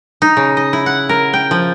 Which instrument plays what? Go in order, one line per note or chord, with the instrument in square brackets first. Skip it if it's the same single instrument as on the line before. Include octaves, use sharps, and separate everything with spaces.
[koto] D#4
C#3
D#5
E4
F#5
A#4
G5
F3